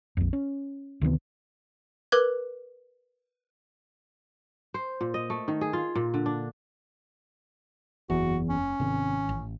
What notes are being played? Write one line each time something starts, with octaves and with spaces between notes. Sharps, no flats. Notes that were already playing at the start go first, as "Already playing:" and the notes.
A#1 F2
C#4
D2 C3 D#3 B3
A#4 B4 D6 F#6 G#6
C5
A#2
D#5
A3
D#3
G#4
F4
A#2
D3
D4
F#1 E2 F#4
C#4
G#1 C3 C4
A1